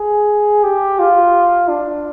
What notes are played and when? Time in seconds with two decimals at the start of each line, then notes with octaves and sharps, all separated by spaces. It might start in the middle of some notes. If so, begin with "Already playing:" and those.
Already playing: G#4
0.63 G4
0.99 F4
1.68 D4